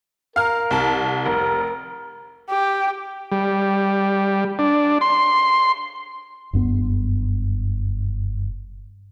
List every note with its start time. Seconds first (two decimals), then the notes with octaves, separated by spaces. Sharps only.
0.36 A#4 F5 F6
0.71 C2 A5
1.26 F1 A#4
2.50 G4
3.32 G3
4.59 D4
5.01 C6
6.53 F#1 G2 B3